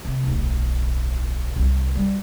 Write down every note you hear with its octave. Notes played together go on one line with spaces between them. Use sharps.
C3
D1 B1
C2
G3